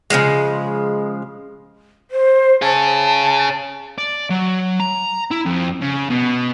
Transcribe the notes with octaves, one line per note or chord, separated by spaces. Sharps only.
C#3 E3 F3 G#3
C5
C#4 G#4 A5
D5
F#3
A#5
E4
F2
C#3
B2